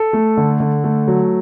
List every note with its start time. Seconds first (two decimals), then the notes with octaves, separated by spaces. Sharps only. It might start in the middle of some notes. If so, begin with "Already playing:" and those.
Already playing: A4
0.13 A3
0.37 D3
0.60 D3
0.84 A3
1.08 F#3